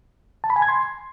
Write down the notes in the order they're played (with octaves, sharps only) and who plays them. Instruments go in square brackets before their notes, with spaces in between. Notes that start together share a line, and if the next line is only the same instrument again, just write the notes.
[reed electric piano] A5
B5
G#5
G#6
C6